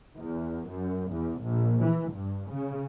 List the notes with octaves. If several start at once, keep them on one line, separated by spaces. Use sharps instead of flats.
E2
F#2
E2
A#1
E3
G2
C#3